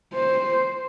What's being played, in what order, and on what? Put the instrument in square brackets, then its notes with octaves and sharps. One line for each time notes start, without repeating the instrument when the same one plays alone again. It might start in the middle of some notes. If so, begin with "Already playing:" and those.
[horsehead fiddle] C5